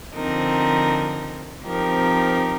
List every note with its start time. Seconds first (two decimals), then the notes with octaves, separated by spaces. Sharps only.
0.13 D3 F3 C4 D#4 A#4
1.64 F3 C4 D#4 G4 A#4